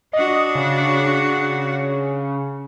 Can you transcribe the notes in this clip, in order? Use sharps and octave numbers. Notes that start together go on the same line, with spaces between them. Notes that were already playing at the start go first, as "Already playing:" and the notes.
D4 F#4 D#5
C#3